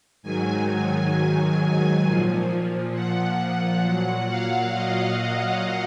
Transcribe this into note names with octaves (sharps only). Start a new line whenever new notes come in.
G#2 D#3 F#3 G#5
A#2 F3
F#5
A#2 F#3 F#5
F5
D#5